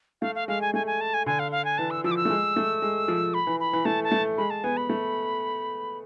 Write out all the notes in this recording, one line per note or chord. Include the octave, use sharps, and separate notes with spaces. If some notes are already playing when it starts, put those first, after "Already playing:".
A3 F5
F5
G#3 F5
G#5
A3 G#5
G#5
A5
G#5
D3 G#5
F5
F5
G#5
E3 A5
E6
F3 E6
D6
E6
A3
G#3
A3
G#3
F3
B5
E3
B5
E3
A3 A5
A5
A3
G#3 B5
A5
B3 G#5
B5
A3